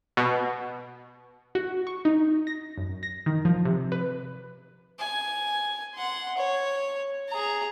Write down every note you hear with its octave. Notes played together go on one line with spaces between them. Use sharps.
B2
F#4
C#6
D#4
A#6
F#2
A#6
D#3
F3
C3
B4
G#5
F#5 C6
C#5
G#4 A#5